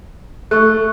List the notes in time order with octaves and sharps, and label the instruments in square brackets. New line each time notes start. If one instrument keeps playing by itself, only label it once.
[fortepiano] A3 [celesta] C#6 F#6